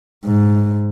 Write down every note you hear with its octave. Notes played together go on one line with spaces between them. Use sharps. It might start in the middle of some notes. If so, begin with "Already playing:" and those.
G#2